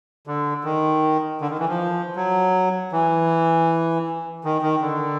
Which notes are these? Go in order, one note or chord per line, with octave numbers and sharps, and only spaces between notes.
D3
D#3
D3
D#3
E3
F3
F#3
E3
D#3
D#3
D3